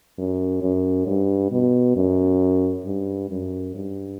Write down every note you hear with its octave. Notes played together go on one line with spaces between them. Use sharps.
F#2
F#2
G2
B2
F#2
G2
F#2
G2